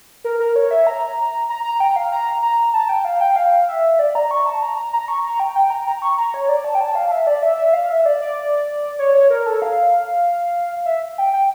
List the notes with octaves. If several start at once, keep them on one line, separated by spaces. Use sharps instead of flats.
A#4
A#4
C#5
E5
A#5
A#5
A#5
G5
F5
A#5
A#5
A5
G5
F5
G5
F5
E5
D5
A#5
C#6
A5
A#5
A#5
A#5
C#6
A#5
G5
G5
A#5
A#5
C#6
A#5
C#5
D5
A5
G5
A5
F5
E5
D5
E5
E5
F5
E5
D5
D5
C#5
C#5
A#4
A4
F5
E5
G5
G5